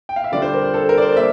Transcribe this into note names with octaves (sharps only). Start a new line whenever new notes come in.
G5
F5
E5
D3 G3 D4 F4 D5
C5
A#4
C5
A4
A#4
D5
C5
D5
A#3 E5